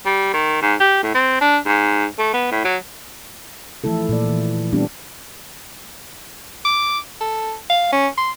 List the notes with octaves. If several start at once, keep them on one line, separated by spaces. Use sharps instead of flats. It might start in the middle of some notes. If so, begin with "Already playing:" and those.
G3
D#3
G#2
G4
A2
C4
D4
G#2
A3
B3
A2
F#3
E3 F3 A3 E4 A4
A#2 A#3 D5
E3
G3 B3 C4 D4 G4
D6
A4
F5
C#4
C6